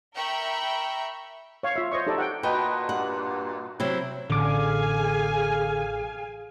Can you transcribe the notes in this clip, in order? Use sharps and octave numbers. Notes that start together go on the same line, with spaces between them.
A#4 E5 G5 A#5 B5 C#6
C#5 F5 C#6
F4 E5
C5 C#5 D#5 C#6
D#4 G4 A4 D5
F#5 G5
A#2 F#4 B4 D#5 G5 A5
G2 F#5
C3 F#3 C4 E4
A1 D3 G#4 F5 G#5 D6